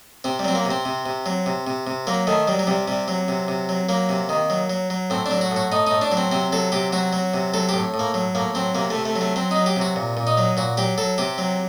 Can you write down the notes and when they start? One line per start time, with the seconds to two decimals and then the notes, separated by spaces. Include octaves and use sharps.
0.24 C3 C4
0.39 G3
0.45 F#3 C4
0.55 A#3
0.65 C3
0.71 C4
0.85 C3
1.06 C3
1.26 F#3
1.46 C3
1.67 C3
1.87 C3
2.07 F#3 A#3
2.27 D#3 A3
2.48 F#3 G3
2.59 F#3
2.67 C3 G3
2.88 C3 G3
3.08 F#3
3.28 C3
3.48 C3
3.69 F#3
3.89 F#3 A#3
4.09 C3
4.29 D#3
4.50 F#3
4.70 F#3
4.90 F#3
5.10 A2 C4
5.26 D4
5.31 F#3
5.41 F#4
5.51 A2 F#4
5.72 A2 D#4
5.87 A2 D#4
6.02 D4
6.12 F#3
6.17 C4
6.32 C3 C4
6.52 F#3 A4
6.72 C3 G4
6.93 F#3 F#4
7.13 F#3
7.34 C3
7.54 F#3 A4
7.69 G4
7.74 A2
7.94 A2
7.99 A#3
8.14 F#3
8.35 A2 A#3
8.55 F#3 C4
8.75 C3 A#3
8.90 C3 A3
9.05 A3
9.16 F#3
9.21 A3
9.36 F#3 C4
9.51 F#3 D#4
9.66 G4
9.76 C3
9.81 F#4
9.96 A#2
10.17 A#2
10.27 D#4
10.37 F#3
10.57 A#2 F#4
10.77 F#3 G4
10.98 F#3 A4
11.18 C3 G4
11.38 F#3